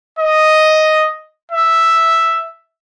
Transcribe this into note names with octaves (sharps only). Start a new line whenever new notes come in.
D#5
E5